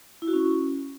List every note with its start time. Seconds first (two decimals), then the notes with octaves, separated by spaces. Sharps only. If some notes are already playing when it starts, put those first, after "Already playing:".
0.22 E4
0.28 F#4
0.33 C#4